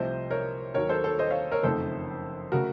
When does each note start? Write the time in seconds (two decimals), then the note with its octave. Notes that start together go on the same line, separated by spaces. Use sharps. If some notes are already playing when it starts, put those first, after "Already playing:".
Already playing: C2 C3 F3 A3 C5 D#5
0.31 A#4 C#5
0.74 D#2 D#3 F#3 A#4 C#5
0.89 A4 C5
1.04 A4 C5
1.19 C5 D#5
1.30 C#5 F5
1.52 A#4 C#5
1.63 F#1 F2 D#3 A3 A4 C5
2.52 C#3 A3 F#4 A#4